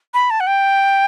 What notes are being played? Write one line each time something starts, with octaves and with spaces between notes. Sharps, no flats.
B5
A5
F#5
G5